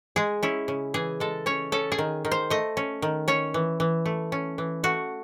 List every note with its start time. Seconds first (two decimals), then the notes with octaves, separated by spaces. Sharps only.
0.16 G#3 G#4
0.43 C#4 E4
0.68 C#3
0.94 E3 G#4
1.20 G#3 A4
1.46 C#4 C#5
1.72 C#4 A4
1.92 G#4
1.98 D#3
2.25 D#3
2.31 C5
2.50 A3 D#5
2.77 C#4
3.02 D#3
3.28 C#4 C#5
3.54 E3
3.80 E3
4.06 A3
4.32 C#4
4.58 E3
4.83 A3 F#4